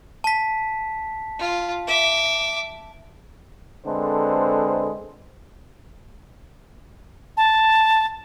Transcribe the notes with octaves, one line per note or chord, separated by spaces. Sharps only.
A5 B6
F4
E5 D6
D3 G#3 C4 A4 B4 C5
A5